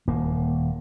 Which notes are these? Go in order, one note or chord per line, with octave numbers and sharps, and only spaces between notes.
D#1 A#3